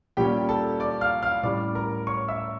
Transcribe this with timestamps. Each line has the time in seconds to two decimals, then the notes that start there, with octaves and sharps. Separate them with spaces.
0.17 A#2 G3 A#3 C#4 G4 G5
0.49 A4 A5
0.80 D5 D6
1.01 F5 F6
1.23 F5 F6
1.43 A2 G3 C#4 D5 D6
1.75 A#4 A#5
2.07 C#5 C#6
2.28 E5 E6